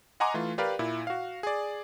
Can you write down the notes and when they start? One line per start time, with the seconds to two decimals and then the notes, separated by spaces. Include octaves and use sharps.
0.20 D#5 F#5 G#5 A#5 C6 D6
0.34 E3 A3 F4
0.58 G4 A#4 B4 D5 F5
0.79 A#2 E4
1.07 F#4 F5
1.43 G#4 D5